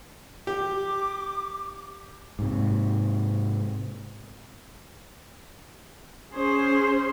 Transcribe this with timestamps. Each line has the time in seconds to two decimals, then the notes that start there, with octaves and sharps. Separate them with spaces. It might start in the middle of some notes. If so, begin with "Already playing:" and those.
0.47 G4 D6
2.39 G#2 C3
6.34 C#4 G#4 C5